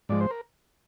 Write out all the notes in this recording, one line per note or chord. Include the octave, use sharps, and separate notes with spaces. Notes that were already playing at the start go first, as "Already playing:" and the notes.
G#2 F3 G#3 D5
C5
A#4